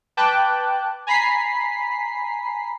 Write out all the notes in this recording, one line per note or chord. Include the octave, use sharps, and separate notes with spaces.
B4 G5 A5 D6 F#6
G#5 A#5 B5 B6 C7